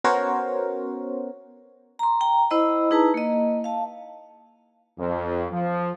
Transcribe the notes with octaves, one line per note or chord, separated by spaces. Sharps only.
B3 C#4 F#4 A#4 C5 C#5
A#5 C6
G5 A#5
E4 C5 D#5 B5
D#4 E4 G#4 B4 A5 A#5
A#3 D#5
F5 A5
F2
F3